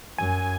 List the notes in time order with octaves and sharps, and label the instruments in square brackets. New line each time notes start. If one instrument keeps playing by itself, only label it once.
[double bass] F#2 [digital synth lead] G#5